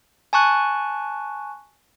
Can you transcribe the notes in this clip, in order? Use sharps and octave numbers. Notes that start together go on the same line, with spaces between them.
G#5 A5 C#6 F#6